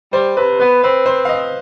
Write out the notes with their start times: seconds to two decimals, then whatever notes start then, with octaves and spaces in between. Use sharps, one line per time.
0.13 G3 C5
0.36 C3 B4
0.60 B3 B4
0.84 C4 B4
1.06 C5
1.25 F5
1.29 D#5